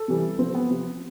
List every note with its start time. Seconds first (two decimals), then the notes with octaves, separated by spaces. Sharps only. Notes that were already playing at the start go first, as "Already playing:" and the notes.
Already playing: A4
0.08 C3 E3 G3
0.39 C3 F3 C4
0.55 B3
0.70 C3 F3